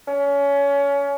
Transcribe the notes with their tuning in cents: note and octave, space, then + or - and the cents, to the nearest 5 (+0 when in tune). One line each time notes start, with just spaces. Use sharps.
C#4 +25